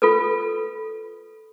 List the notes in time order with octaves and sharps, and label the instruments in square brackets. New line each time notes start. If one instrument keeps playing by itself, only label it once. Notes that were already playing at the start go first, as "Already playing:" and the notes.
[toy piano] F4 A4 B4